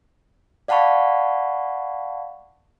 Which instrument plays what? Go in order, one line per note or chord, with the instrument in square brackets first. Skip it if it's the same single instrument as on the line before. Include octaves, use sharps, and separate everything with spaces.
[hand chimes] D5 F5 F#5 A5 B5 C#6